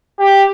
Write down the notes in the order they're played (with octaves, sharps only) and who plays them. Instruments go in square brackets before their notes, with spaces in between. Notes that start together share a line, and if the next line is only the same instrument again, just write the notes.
[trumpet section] G4